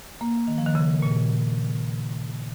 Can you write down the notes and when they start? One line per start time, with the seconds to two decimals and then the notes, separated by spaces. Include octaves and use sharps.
0.21 A#3
0.48 D#3
0.58 F3
0.66 D#3
0.75 C#3
1.02 A#2